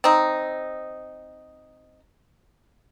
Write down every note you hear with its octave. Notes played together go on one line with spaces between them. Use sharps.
C4 D#4